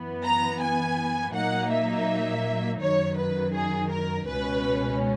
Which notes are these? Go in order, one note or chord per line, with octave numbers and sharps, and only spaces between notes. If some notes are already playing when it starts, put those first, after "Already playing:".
Already playing: F#2 E3 B3
A#5
G#5
A#2 F#3 A#3 D#4 F#5
E5
F#2 D#3 F#3 C#5
B4
G#4
A#4
C#2 B2 G#3 C#4 B4